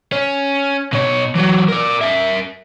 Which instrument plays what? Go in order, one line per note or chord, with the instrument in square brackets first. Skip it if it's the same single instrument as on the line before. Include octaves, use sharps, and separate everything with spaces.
[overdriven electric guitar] C#4
B2 C#5
E3 F#3
A#4 D5
A#4 E5